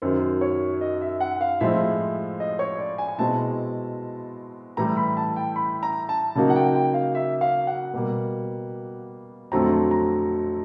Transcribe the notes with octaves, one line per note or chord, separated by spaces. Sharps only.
F#2 D#3 F#3 C5
C#5
D#5
E5
F#5
F5
A2 F3 G#3 C4 F4 E5
D#5
C#5
D5
G#5
G#5
B2 G#3 C4 E4 A5
A2 E3 G3 A#5
B5
A5
G5
B5
A#5
A5
C#3 F#3 A#3 D#4 F#4 A5
F#5
G5
G5
F5
E5
F5
F#5
B2 G3 A#3
F2 D3 F#3 A3 C4 A#5
A#5